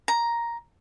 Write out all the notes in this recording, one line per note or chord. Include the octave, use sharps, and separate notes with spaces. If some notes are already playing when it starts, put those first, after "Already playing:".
A#5